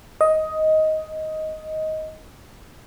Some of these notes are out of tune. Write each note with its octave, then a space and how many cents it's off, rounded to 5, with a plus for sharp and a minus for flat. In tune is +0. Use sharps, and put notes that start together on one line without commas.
D#5 +10